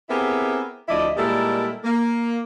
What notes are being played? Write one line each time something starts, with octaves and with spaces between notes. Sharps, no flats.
B3 C4 E4 G4 G#4 A#4
D2 F3 E4 D5 D#5
A#2 G3 G#3 E4 A4 A#4
A#3